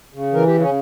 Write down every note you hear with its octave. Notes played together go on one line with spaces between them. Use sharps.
C#3
E3 A#4
G4
C#3
C#4